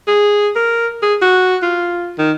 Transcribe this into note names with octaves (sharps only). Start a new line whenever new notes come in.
G#4
A#4
G#4
F#4
F4
D#3